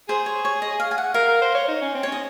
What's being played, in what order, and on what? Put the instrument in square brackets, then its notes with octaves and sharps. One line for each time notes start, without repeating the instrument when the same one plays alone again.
[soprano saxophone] G#4 [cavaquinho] C5
[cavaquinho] C#5
C#5
D#5
F5
G#5
F#5
[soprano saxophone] A#4 [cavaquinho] F5
[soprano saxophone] A#4
C5
C#5
D#4
C#4
C4
[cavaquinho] C#5
[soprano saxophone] C#4
[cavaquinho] D#5